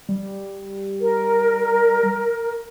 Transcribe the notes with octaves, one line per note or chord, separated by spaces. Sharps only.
G3
A#4